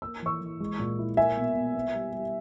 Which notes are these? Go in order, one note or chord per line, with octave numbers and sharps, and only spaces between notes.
A#3 E6
E3 C#6 E6
E3
G#3
A#2
E4
A#3 E5 G#5
B2
B2
B3
G3
G3